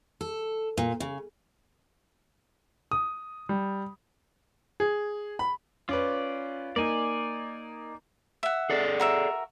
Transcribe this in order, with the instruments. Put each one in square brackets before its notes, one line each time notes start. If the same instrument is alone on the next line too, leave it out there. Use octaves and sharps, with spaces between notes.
[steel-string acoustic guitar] A4
A#2
C#3
[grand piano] D#6
G3
[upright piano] G#4
B5
[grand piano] C#4 B4 [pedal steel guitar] F4 D5
[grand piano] A#3 D#4 [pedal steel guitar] D5 G#5
[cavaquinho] E5 F#5
[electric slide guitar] G#4 A4 D5
[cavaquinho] F#4 A#4 E5